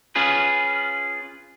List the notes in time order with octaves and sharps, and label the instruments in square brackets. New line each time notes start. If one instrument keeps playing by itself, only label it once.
[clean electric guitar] C#4 F4 G#4 B4